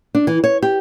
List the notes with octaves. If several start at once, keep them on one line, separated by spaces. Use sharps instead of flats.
D4
E3
C#5
G4